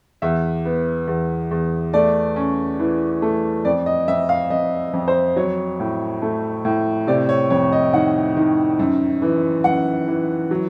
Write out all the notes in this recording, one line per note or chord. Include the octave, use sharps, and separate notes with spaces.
E2 E5
B3
E2
E2
A3 D5
C#4
E3
A3
F2 D5
D#5
F2 E5
F5
F2 D#5
F2
C5
F#3 C#5
A2
A3
A2
C3 D5
C#5
F2 C#5
D#5
D#3 F#5
D#3
F#2
E3
F#2 F#5
E3
F#3